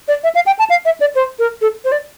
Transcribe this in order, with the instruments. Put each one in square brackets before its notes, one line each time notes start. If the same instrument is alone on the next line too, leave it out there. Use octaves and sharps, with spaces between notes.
[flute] D5
E5
F5
G5
A5
F5
E5
D5
C5
A#4
A4
C5
D5